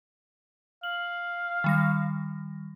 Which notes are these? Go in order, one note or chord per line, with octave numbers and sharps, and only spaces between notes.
F5 F#7
D#3 G3 A#6